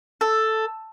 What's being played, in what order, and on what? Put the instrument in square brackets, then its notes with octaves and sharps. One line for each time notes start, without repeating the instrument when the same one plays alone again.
[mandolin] A4